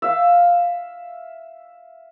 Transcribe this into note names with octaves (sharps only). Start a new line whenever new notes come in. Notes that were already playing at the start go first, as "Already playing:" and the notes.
E5 F5